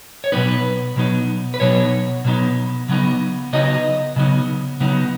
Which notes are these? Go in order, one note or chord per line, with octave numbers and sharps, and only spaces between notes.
C#5
B2 F#3 B3 D#4 B4
B2 F#3 B3 D#4
B4
B2 F#3 B3 D#4 C#5
B2 F#3 B3 D#4
C#3 F#3 B3 D#4
C#3 F#3 B3 D#4 D#5
C#3 F#3 B3 D#4
C#3 F#3 B3 D#4